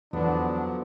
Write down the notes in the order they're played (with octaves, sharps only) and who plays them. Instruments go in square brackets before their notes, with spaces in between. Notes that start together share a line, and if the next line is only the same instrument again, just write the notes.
[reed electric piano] E2 [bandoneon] D3 F3 F#3 [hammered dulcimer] B3 [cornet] D4